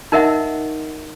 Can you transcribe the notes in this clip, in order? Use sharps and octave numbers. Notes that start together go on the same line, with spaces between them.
D#4 A#4 D#5 E5 F#5